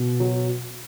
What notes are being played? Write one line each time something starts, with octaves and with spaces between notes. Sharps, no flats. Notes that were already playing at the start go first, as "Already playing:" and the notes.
Already playing: B2
F#3